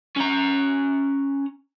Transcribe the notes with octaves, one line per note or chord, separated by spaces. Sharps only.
C#4 A#5